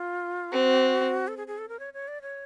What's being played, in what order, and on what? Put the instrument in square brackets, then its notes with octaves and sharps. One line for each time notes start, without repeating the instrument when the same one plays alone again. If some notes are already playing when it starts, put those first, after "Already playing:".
Already playing: [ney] F4
[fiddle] C4 [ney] F#4
[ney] A4
G#4
G#4
A4
A#4
C#5
C#5
D5
C#5